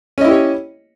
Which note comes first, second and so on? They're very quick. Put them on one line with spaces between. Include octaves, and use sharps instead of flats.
C#4 D#5 E4 G4 C#5